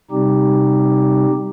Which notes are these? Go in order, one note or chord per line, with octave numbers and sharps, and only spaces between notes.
C3 G3 C4 D#4 G4